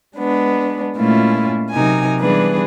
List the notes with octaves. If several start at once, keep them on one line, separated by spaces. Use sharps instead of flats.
G#3 B3 D4
A#2 G#3 A3 C#4 E4 F4
C3 F#3 D#4 A#4 G#5
E3 G3 B3 D4 G#4 B4